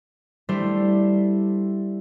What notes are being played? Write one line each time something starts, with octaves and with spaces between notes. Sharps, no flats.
G3 A3 D4 E4 C5